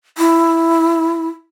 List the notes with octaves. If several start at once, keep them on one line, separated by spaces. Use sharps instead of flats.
E4